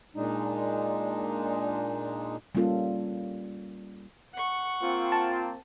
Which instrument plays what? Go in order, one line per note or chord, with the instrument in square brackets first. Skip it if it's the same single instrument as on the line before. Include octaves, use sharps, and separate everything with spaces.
[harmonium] A#2 G#3 D4 D#4
[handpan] G3 A#3 C#4 F4 A4
[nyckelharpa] F#5 C#6
[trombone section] A#3 C4 [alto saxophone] F4
[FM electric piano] A5